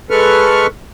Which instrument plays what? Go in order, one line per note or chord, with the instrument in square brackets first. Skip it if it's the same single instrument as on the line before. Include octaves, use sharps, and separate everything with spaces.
[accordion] G#3 A4 B4 C#6 F6